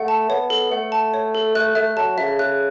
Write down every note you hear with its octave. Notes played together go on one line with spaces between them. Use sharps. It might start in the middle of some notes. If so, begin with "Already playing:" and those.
Already playing: A3 F#5
A5
B3 C#5
A4
A3 F#5
A5
C#5
A4
A3 F#6
A3 E5
F#3 A5
C#3 E5
C#3 F#6